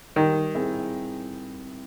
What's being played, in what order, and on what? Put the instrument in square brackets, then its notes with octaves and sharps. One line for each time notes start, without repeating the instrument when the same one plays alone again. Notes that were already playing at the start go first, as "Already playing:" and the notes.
[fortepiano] D#3 [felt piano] G3
[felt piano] C4 E4 G#4